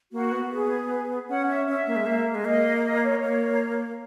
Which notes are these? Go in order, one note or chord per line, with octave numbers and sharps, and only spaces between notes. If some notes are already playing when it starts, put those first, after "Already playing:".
A#3 F#4
B3
G#4
C#4 F#5
E5
C#4 E5
A#3
G#3
A#3
G#3
A#3 D#5
D#5
C#5
A#3